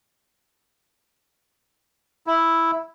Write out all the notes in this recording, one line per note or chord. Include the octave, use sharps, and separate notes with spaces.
E4